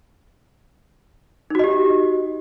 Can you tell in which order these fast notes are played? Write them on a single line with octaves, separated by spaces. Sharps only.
D#4 F#4 D#5 G4